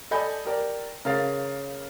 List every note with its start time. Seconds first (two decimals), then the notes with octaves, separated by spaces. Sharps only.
0.11 A4 D5 D#5 G#5 B5 G6
0.45 G4 A#4 D5
1.05 C#3 A#4 F5 A6